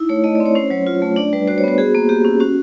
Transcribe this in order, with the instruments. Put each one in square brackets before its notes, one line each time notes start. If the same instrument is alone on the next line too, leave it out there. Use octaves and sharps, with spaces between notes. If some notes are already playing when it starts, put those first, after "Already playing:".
Already playing: [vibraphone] D#4 E4
A3 C#5
A3 D#5
D5
C4
C#5
C#4 C5
F#3 C#5
F4
A3
D4 D5
G3 B4
F#4 C5
C#5
B3 C5
F#4 G#4
A#3
A#3 G4
C#4
C#4 F#4